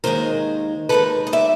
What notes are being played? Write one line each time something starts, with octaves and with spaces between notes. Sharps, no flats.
D#2 D#3 G#3 A#4 C5
D#2 D#3 G#3 A4 B4
D#5
D5 E5